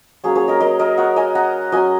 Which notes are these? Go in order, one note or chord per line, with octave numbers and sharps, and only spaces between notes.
F#3 A#3 C#4 G#4 C#5
G#4 C#5
A#4 D#5
A#4 D#5
A#4 D#5
C#5 F#5
D#5 G#5
F#5 A#5
F#3 C#4 D#5 G#5